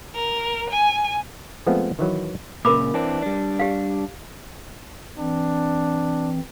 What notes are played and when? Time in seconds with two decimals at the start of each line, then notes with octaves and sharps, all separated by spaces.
0.13 A#4
0.69 G#5
1.67 F3 G#3 A3 B3 C4 F4
1.99 D#3 E3 F#3 B4
2.65 A#2 C#3 A#4 B5 D6
2.94 E3 C4 D4
3.22 G3 D4
3.59 G4 F5
5.18 E3 C4 D4